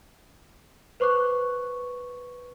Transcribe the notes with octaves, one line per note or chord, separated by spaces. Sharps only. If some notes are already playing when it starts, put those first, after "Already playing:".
B4 C5 C#6 D6 F#6